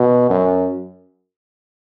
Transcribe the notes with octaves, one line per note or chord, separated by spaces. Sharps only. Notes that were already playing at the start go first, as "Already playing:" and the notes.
Already playing: B2
F#2